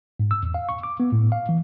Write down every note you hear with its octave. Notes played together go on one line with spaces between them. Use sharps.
G#2
E6
E2
F5
C#6
D6
B3
A2
F5
E3